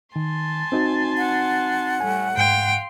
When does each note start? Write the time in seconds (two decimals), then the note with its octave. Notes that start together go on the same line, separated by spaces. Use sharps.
0.16 D#3 G#5 A5 C6
0.72 C4 D#4 F#4
1.18 F#5
2.00 A2 G3 A3 G#5
2.37 G#2 F5 G5 C6